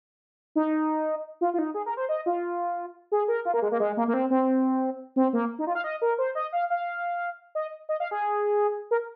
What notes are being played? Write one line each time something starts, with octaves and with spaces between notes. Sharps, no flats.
D#4
F4
F4
D#4
G#4
A#4
C5
D#5
F4
G#4
A#4
F4
A#3
G#3
A#3
G#3
A#3
A#3
C4
C4
C4
A#3
D#4
F4
F5
D#5
A#4
C5
D#5
F5
F5
D#5
D#5
F5
G#4
A#4